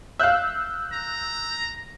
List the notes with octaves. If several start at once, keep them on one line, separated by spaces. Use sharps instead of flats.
E5 F5 E6 F#6 G6
A#5